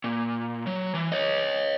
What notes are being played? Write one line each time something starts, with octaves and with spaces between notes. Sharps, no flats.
A#2
F#3
E3
C#5 D#5